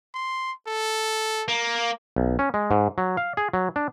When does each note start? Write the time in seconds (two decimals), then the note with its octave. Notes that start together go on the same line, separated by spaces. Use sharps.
0.14 C6
0.67 A4
1.48 A#3
2.16 B1
2.39 C#4
2.54 G#3
2.71 G#2
2.98 F#3
3.17 F5
3.37 G#4
3.53 F#3
3.76 D4